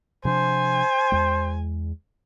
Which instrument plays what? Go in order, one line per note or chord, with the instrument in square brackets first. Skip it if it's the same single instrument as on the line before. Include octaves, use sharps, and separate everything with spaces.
[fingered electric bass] C3 F3 D4 [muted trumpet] C5 [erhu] G#5
[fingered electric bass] E2 G#3